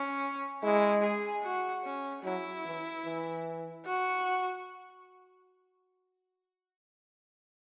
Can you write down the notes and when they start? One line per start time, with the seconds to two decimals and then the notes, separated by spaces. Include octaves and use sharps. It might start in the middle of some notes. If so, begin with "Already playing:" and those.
Already playing: C#4
0.63 G#3 E4
1.02 G#4
1.43 F#4
1.84 C#4
2.24 F#3 E4
2.65 E3
3.05 E3
3.86 F#4